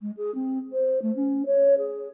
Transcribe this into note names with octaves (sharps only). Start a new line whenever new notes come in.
G#3
G#4
C4
C5
A3
C#4
C#5
G#4